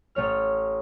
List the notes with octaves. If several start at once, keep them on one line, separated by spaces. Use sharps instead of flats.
A1 A3 C#5 F6